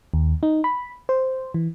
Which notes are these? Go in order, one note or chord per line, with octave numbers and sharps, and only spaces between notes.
D#2
D#4
B5
C5
E3